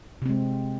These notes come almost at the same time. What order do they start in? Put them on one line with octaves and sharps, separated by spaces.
C3 C4 G#3